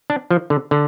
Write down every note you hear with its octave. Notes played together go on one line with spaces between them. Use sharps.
D4
F3
D3
D3